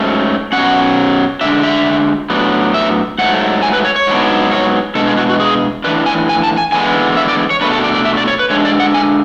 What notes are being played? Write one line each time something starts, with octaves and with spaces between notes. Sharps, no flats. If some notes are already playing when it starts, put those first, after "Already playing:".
Already playing: G#2 F#3 A3 C#4
B2 F#3 C#4 F#5
D3 G#3 B3 D4 E5
E5
A2 F#3 B3 D4
E5
G#2 F#3 A3 F#5
G#5
B4
C#5
C#5
G#2 F#3 B3 D4
C#5
B2 G#3 D4 A4
G#4
F#4
F#4
G#4
A2 E3 A3 D4 B4
G#5
G#5
A5
G#5
E2 D3 G#3 B3 G#5
E5
D5
C#5
B2 A3 D4 B4
A4
D5
D5
E5
D5
C#5
B4
D3 G#3 D4 C#5
D5
F#5
G#5